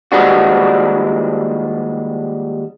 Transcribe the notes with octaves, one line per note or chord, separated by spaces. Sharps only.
D#2 F3 G3 G#3 D4 F#4